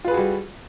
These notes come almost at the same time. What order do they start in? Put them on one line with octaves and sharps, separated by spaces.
F4 B4 G#4 F#4 G3